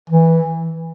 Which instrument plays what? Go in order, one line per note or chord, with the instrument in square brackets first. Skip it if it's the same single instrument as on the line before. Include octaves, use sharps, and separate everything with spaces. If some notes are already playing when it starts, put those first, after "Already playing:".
[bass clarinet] E3